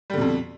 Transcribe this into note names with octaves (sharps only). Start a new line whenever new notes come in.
F2 B2 D3 G3